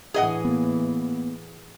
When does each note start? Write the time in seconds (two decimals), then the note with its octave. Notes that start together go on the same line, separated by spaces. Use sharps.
0.14 A2 E3 G#4 D#5 F#5
0.45 A#3 B3